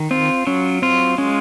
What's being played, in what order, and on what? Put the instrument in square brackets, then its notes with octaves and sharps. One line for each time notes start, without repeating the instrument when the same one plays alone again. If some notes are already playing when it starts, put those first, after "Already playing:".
Already playing: [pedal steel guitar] D#3
[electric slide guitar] C4 [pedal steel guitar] F4
[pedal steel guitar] F#3 [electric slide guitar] C#4
[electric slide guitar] C4 [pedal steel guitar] F4
[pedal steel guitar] G#3 [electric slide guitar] C#4